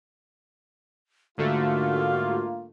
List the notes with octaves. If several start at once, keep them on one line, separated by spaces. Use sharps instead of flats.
G#2 D3 A3 A#3 F4 F#4